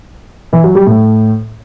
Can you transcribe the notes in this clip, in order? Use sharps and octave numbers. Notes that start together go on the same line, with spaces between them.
E3
F#3
G3
A2